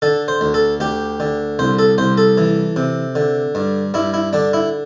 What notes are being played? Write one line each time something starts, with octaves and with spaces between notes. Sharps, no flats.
D3 A4
C5
D2
A4
D2 G4
D3
C2 C5
A4
C2 C5
A4
E3
C3
D3
G2
G2 E4
E4
D3 D4
E4